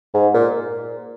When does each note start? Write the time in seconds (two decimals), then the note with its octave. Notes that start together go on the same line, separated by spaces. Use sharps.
0.14 G#2
0.34 A#2